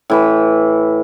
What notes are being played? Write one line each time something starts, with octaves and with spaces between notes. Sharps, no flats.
A2 E3 B5